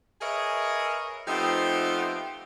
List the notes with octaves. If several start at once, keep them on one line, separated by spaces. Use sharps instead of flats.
G#4 A#4 B4 C#5 D#5 E5
F3 A3 B3 C4 D#4 G4